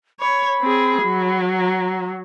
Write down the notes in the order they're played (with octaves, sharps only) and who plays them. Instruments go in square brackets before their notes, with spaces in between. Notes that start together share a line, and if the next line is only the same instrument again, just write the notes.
[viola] C#5 [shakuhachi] B5
[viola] C4 G#4
F#3
[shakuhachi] A#5